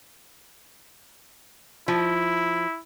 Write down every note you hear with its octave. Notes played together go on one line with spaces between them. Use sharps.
F3 E4